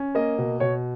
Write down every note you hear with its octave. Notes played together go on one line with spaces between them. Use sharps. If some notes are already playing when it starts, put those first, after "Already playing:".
Already playing: C#4
A#3 D#5
B2
B2 C#5